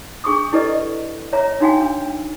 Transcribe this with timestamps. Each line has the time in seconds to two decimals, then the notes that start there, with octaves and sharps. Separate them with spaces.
0.24 D4 G#4 C#6 D#6
0.53 E4 G4 A4 B4 D5 D#5
1.33 C#5 E5 A#5
1.60 D4 D#4 F#4 F5 G5 G#5
1.81 D4